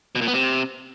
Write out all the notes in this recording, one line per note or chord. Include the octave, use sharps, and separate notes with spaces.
B2
A#2
B3
C3